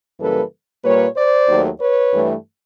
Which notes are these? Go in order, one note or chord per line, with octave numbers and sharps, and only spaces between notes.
F#2 C#3 E3 G3 A#3 A4 B4
A#2 G3 A#3 B4 C#5
C5 D5
D#2 D#3 F#3 A3
B4 C#5
G2 E3 A3